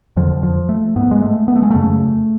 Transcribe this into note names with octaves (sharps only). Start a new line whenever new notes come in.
F2 D3 F3
F3
A3
G#2 B3
G#3
A3
B3
A3
G#3
F#2 C#3 A3